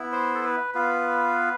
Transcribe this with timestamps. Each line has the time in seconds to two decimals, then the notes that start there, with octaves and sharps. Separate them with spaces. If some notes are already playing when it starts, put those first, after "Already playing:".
Already playing: B3 E4
0.12 C5
0.35 A4
0.44 B4
0.74 B3 F4 B4